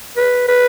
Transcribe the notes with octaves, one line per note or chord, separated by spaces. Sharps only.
B4
B4